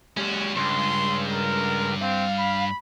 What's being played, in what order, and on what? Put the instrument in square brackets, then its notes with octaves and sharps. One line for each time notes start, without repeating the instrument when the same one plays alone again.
[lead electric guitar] G#3 G4 [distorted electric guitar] C#4 F#4
[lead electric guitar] C#2 [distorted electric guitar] G2 [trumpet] C6
[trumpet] A#4
[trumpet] C4 [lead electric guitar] F5
[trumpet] B5